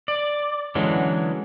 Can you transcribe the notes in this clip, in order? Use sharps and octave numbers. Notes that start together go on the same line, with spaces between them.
D5
D3 E3 F#3 G#3 C#4